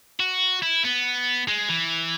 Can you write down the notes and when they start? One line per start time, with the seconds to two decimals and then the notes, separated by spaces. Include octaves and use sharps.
0.20 F#4
0.63 E4
0.84 B3
1.48 G#3
1.69 E3